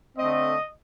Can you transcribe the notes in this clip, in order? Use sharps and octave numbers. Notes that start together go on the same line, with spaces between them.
D3 A3 C4 D#5